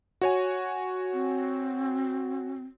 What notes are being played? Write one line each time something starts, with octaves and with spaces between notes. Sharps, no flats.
F#4 C#5 G#5
C4